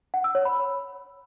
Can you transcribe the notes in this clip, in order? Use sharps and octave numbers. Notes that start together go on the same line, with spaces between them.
F#5
E6
C#5
B5